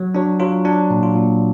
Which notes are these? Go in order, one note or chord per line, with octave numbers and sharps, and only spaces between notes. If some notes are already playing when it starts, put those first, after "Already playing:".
Already playing: F#3
F#3 D4
F#3 F4
F#3 D4
A#2
F4
A#2